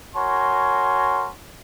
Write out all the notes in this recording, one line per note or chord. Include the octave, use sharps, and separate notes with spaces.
F#4 A#4 C#5 G#5 C6